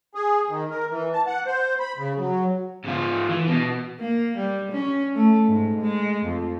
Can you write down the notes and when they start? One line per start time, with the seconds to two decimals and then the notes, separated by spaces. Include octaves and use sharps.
0.15 G#4
0.49 D#3
0.70 A#4
0.90 E3
1.13 A5
1.27 F#5
1.46 C5
1.80 B5
1.98 C#3
2.18 F#3
2.85 G#2 F4
3.30 E3
3.48 B2
3.99 A#3
4.37 G3
4.72 C#4
5.15 A3
5.48 G#2
5.81 G#3
6.24 F2